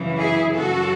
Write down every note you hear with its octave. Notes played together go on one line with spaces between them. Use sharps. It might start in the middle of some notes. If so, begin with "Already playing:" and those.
Already playing: F#2 C#3 E3
E4 G#4
F#2 C#3 F#3 F#4 A4